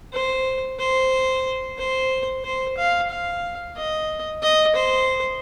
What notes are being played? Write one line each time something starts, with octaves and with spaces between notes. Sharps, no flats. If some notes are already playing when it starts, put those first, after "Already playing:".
C5
C5
C5
C5
F5
F5
D#5
D#5
C5